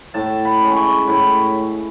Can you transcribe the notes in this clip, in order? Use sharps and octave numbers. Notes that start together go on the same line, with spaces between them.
A2 A5
B5
G#3 C#4
B5
C#6
A2 B5